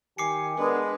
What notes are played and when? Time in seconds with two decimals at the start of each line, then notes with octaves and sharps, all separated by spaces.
0.18 D#3 G4 G#5 D6 C7 C#7
0.58 G#3 B3 D4 A#4 B4